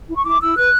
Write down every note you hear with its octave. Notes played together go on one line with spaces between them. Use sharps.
E4
C#6
E4 D6
E4 E6
B4 F#6